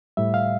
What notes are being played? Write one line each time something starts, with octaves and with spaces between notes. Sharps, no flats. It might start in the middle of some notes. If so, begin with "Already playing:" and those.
A2 G3 E5
F5